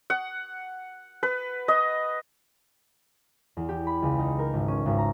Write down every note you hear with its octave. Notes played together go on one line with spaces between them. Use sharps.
F#5
B4
D#5
E2
G4
B5
C#2
D#4
A#4
G#1
C#4
G#1
A#5